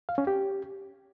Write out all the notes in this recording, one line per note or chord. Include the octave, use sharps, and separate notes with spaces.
F5
C#4
G4